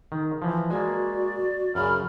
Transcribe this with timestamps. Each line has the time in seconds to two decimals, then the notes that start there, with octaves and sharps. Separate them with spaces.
0.12 D#3
0.42 E3 F3
0.70 G#3 A#3 F#4 D5
1.75 F#2 C#3 B5 F6